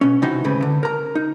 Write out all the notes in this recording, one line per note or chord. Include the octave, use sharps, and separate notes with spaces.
B2 C#4
C3 E3 D#4 F#4
D2 G#2 C#3 C4 B4
D3
A#4 A#5
D#4